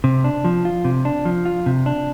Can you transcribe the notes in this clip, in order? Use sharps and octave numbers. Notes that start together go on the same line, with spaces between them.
C3
D4
F3
F4
C3
D4
F3
F4
C3
D4